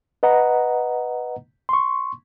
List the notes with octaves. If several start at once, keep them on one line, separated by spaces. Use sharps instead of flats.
B4 D#5 F#5 A#5
C6 C#6